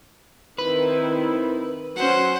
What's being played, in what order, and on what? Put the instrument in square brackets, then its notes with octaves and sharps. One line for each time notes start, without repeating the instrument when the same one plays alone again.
[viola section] D#3 C4 E4 [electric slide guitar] B4
[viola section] F#3 C#4 [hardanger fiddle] C5 F#5